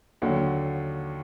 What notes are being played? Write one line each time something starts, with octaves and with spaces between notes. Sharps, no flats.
D#2 D3 F#3